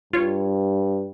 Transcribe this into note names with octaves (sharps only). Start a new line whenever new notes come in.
G2 F4 C#5